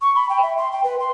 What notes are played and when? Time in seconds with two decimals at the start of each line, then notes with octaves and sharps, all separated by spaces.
0.01 C#6
0.15 B5
0.29 G5
0.42 E5
0.57 C6
0.72 G5
0.83 B4
0.99 C6